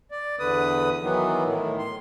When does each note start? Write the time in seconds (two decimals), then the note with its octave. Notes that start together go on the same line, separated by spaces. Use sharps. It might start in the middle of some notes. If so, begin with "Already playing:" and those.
0.11 D5
0.39 E2 D3 B4 D#6
1.02 D#3 E3 F#3 B3
1.44 A2 D#3
1.79 C6